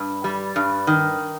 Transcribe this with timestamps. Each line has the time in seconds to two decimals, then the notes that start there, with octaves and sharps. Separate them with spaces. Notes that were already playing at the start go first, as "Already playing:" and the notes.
Already playing: G2
0.24 G3
0.56 G2
0.87 D#3